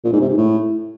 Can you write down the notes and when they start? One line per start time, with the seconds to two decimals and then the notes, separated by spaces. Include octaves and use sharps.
0.04 A#2
0.13 G#2
0.21 C3
0.29 G#2
0.37 A2